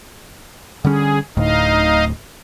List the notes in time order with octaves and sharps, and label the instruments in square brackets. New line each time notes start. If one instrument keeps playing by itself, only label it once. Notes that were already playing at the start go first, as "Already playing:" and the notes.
[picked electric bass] D3 G3 C#4 [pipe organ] G#4
[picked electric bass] D1 D2 A2 [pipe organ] D#4 D#5 F5